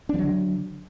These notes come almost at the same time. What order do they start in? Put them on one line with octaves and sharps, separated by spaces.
D4 F3 F#3 D3